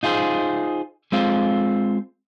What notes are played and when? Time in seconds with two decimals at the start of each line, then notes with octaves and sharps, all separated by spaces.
0.03 D#4 F4 G#4 C5
1.12 G#3 C4 F4